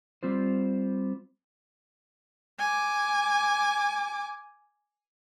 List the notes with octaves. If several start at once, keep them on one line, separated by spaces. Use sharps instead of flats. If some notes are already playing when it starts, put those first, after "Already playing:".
G3 C4 F4 C5
G#5 D6